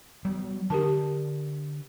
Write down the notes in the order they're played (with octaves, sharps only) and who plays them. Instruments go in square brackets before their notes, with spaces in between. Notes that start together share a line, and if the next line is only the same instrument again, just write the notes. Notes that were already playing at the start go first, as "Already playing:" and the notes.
[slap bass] F#3 G3 B3
[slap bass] D3 [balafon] G4 A#4 A5